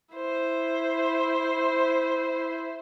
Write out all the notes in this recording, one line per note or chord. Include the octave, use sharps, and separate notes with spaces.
E4 C5